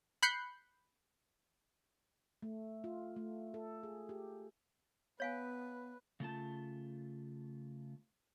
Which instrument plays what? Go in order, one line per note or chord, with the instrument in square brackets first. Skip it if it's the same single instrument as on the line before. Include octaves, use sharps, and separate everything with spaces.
[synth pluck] B5 F#6 G6 C7 C#7
[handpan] A3
F4
A3
A4
G#4
G4
[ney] B3 [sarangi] B4 [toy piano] C#5 F5 G#5
[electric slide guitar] C#3 A3 F4 A5